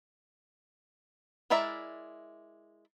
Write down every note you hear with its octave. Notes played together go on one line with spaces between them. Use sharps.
G#3 E4 A#4 D5 E5